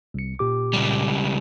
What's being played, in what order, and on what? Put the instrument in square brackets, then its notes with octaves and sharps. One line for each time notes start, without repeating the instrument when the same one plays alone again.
[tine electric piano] C2 C#7
A#2 G4 D6
[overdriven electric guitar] C#2 G3